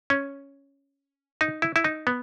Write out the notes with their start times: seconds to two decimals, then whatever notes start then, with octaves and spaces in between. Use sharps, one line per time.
0.10 C#4
1.41 D#4
1.62 E4
1.76 E4
1.84 D#4
2.07 B3